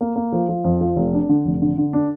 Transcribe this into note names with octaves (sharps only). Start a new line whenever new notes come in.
A#3
A#3
F3
F3
F2
F3
F1
D4
D3
F1
D3
D3
D4